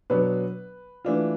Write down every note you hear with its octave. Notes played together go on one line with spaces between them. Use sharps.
B2 F#3 B3 D4 B4
E3 A3 D4 F4